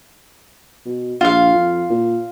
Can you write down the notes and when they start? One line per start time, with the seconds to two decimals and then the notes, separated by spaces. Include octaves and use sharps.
0.86 B2
1.21 A#1 F4 F5
1.53 F2
1.90 A#2